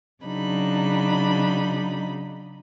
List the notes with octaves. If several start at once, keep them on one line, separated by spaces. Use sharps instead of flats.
C#3 F#3 D4 D#4 B5